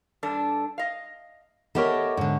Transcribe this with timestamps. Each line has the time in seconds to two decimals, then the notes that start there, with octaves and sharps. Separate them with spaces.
0.23 G2 D4 A4
0.78 D#5 F5
1.75 A3 B3 G4 A4 A#4 C#5 D#5 G5
2.17 G#2 D3 F#5